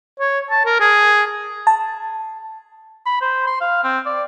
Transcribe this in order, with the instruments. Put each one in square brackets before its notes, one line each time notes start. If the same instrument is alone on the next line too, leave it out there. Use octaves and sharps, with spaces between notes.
[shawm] C#5
A5
A#4
G#4
[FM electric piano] A5
[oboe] B5
C5
C6
F5
C4
D5